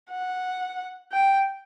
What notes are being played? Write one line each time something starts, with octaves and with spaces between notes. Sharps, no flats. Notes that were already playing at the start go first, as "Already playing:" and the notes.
F#5
G5